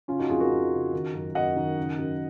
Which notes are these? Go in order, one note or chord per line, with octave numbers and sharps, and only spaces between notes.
C#3 C#4 F4
D#4 F#4
F2 F4 G#4
F#4 A#4
F2
C#3
D#3
F#2
F#2 D#5 F#5
D#3
C#3
F#2